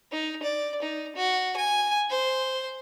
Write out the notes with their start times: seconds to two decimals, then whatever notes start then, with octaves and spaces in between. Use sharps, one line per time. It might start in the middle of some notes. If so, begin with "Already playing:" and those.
0.12 D#4
0.43 D5
0.82 D#4
1.16 F#4
1.57 G#5
2.10 C5